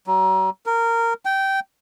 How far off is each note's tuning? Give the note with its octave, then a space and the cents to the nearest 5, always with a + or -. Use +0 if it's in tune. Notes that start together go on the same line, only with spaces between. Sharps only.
F#3 +40
A#4 -15
G5 -15